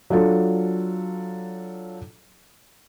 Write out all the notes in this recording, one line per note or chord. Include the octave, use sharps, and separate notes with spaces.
F#3 D4 F4 A4